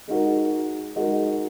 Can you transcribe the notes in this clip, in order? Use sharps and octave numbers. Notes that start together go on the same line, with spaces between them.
G#3 D#4 F#4 A#4
G#3 D#4 F#4 A#4